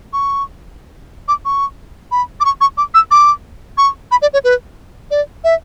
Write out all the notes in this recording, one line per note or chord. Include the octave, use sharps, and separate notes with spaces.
C#6
D6
C#6
B5
D6
C#6
C#6
D6
E6
D6
C#6
B5
D5
C#5
B4
D5
E5